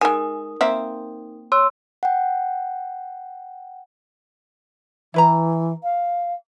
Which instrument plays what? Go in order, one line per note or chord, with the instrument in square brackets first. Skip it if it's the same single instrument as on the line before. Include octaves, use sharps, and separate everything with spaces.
[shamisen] G#3 G#5 [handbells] D#4 A#4 D#6
[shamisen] A#3 C4 E5
[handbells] C#5 [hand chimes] C6 E6
[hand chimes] F#5 G5
[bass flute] E3 [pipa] E4 B4 A#5
[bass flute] F5